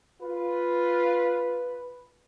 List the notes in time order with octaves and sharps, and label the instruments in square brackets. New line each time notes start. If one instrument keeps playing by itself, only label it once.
[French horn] F4 [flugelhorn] B4